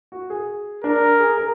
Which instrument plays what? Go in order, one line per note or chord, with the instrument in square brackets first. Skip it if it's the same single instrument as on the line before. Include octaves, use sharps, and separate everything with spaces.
[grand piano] F#4
G#4
[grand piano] D4 [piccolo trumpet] A#4
[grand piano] G#4
A#4